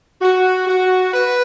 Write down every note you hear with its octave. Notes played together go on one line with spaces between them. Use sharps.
F#4
F#4
B4